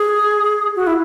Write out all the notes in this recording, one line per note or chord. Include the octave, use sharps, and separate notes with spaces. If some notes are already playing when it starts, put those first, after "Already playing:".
Already playing: G#4
F#4
E4